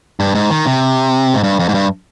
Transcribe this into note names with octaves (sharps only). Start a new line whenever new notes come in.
G2
G#2
D#3
C3
G#2
G2
F2
G#2
G2